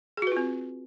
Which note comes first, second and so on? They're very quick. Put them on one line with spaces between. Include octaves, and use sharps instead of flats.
G#4 F#4 B4 F4 C4